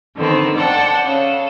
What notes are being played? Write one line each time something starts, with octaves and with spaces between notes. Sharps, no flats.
D3 D#3 B3 C4
D5 F#5 G5 A5
C#3 A4